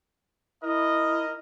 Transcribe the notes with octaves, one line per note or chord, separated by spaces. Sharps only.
E4 A#4 D#5